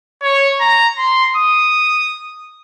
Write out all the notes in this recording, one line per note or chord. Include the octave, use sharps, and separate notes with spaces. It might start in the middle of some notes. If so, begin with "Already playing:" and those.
C#5
A#5
C6
D#6